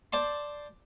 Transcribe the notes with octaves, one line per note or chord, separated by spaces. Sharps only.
C5 D5 A5 C6